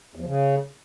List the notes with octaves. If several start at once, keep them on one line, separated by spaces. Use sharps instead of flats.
E2
F3
C#3